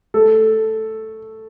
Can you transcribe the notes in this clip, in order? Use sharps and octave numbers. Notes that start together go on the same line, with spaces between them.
A3 A4